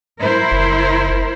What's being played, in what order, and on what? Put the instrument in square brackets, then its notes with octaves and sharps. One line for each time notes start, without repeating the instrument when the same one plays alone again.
[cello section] E4 A#4 C5
[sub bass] F#1